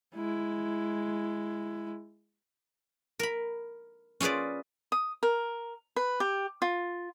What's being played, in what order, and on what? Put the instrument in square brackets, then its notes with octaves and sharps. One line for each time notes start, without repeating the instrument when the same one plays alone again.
[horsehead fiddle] G#3 E4
[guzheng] A#4 B5
C#4 F4 G#4 B4 D5
[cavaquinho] D#6
A#4
B4
G4
F4